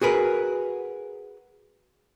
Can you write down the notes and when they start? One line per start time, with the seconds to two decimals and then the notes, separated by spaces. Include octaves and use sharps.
0.02 F#4 G#4 A#4 B4